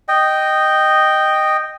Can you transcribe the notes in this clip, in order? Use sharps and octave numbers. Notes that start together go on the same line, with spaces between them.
D#5 G5